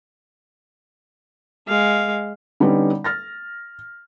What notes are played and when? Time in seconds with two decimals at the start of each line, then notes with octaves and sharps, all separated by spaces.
1.68 G#3 F5
2.60 D3 G3 B3 C#4 D#4
3.04 F6 A6 A#6